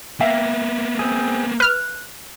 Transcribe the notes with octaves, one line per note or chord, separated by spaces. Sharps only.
A#3 B3 E5 F5 G5
C4 G#4
B4 F6 F#6